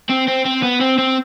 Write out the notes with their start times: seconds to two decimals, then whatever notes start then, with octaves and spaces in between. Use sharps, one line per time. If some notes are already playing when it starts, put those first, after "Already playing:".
0.10 C4
0.28 C4
0.46 C4
0.63 B3
0.81 C4
0.98 C4